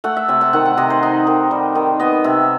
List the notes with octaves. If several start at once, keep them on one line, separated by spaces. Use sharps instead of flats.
A3 F#5
E5
C3 E5
F#5
D#3 F#5
F#5
C3 D#5
C5
D#4
D#3
G3
D#3
B3 D#5
C3 E5